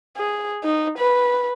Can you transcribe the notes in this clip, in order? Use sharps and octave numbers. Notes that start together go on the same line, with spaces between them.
G#4
D#4
B4